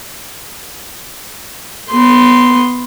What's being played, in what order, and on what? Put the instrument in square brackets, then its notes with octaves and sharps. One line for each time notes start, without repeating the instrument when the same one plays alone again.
[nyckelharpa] B3 C6